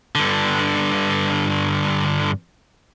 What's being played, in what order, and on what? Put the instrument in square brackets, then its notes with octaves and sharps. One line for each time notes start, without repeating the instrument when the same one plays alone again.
[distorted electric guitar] G2 D3